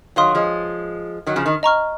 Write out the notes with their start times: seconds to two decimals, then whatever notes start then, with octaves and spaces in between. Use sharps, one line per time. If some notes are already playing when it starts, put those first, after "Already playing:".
0.16 D#3 F#3 C#5 F5 C6 D#6
0.35 F3 G#3
1.27 D#3 F#3
1.36 C#3 F3
1.46 D#3
1.63 D#5 A#5 C#6 F6